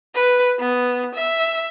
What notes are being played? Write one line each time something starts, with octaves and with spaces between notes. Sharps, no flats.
B4
B3
E5